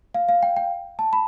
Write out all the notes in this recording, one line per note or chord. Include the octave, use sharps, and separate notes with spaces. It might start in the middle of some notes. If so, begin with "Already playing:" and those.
F5
F5
G5
G5
A5
B5